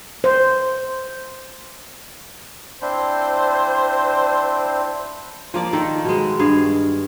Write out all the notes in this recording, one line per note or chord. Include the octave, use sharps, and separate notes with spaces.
C5
C4 D4 E4 C5
F3 A#3 D5
D#3 A4
B2 G#3
G2 G#4 F5